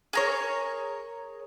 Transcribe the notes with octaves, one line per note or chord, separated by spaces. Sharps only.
G#4 A#4 C#5